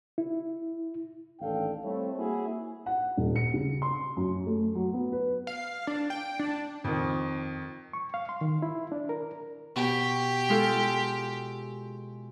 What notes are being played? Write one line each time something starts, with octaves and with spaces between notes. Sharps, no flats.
E4
A1 D#2 D4 A4 F5 G5
G3 A3 C4 E4 C#5
A#3 E4 F#4 G#4
F#5
D#1
C#7
C#3
C6
F#2
A3
F#3
B3
B4
F5
D4
G5
D4
F2 D#3
C#6
F5
C6
D#3
E4
D4
A#4
B2 G4
G#3 F4 A4